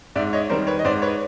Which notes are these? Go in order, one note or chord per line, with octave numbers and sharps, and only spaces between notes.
G#2 D5 E5
C#5 D#5
D#3 G3 A#4 C5
B4 C#5
D#5
G#2 C5 D5
B4 C#5